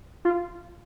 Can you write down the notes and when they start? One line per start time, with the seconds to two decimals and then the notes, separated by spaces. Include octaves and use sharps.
0.25 F4